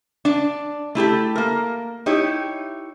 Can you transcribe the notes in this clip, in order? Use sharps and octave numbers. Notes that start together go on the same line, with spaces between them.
D4 D5
A3 E4 G4 A4
A#3 A#4
D#4 E4 G4 C#5